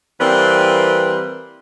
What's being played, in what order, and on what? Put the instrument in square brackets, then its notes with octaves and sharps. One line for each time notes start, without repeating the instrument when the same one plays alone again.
[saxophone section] E3 G3 A#3 C4 B4